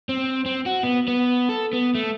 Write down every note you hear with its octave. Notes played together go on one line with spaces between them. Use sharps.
C4
C4
F#4
B3
B3
A4
B3
A3